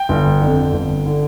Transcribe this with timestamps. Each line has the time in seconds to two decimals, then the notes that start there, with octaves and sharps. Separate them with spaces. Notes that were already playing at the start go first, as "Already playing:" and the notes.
Already playing: G5
0.09 G1
0.41 F2 D3
0.73 G1
1.06 D3